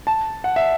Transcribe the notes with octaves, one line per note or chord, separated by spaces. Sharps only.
A5
F#5
E5